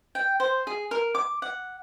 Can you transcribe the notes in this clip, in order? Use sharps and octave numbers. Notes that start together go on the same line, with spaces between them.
G5
C5
G#4
A#4
D6
F#5